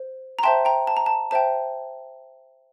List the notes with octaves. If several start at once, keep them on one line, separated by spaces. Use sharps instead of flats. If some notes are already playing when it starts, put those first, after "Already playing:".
Already playing: C5
A#5
C5 E5 G5 A5 C6
G5 A#5
A5
A#5
A5
C5 E5 G5 A5